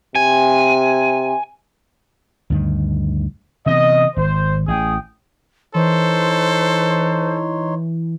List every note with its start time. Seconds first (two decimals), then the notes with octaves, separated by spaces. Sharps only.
0.15 C3 G#5
2.50 D2 G2 D#3
3.66 C3 E3 B3 D#5
4.17 G#1 C5
4.68 A1 G#4 G5 D#6
5.75 E3 D#4 A4 C5 C#5 C6